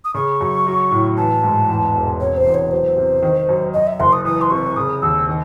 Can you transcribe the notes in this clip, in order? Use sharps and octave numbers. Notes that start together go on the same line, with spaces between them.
D#6
C#3 C#6
F#2
F#3
A2
E3 A5
G#2
E2
E1
C3 C#5
C5
E2
C#5
F#3 C5
C3
D#3
F#2
F#2 D#5
E5
F#1 C6
D#6
E3 D#6
C6
C3 C#6
C#3 D#6
D#2 E6
D#3